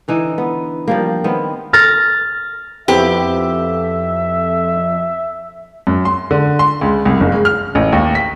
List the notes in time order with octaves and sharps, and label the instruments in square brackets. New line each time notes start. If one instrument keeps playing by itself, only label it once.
[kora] D3 E3 D#4
B3
F3 G3 A#3
D#3 B3 C4
[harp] F6 A6 A#6
[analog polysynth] F2 [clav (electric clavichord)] B3 C4 E4 [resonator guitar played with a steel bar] G4 [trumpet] E5
[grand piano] F#2
C6
D3
C6
C#2
C2
F#1
G#3
F6
A1
D#2
B6